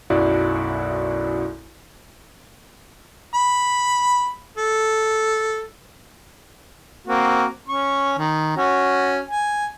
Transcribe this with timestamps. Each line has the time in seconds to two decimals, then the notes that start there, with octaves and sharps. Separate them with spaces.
0.10 B1 F#2 E4 F#4 D5
3.34 B5
4.57 A4
7.07 A#3 C4 F#4
7.68 C#4 C#6
8.18 D#3
8.57 C#4 F#4
9.29 G#5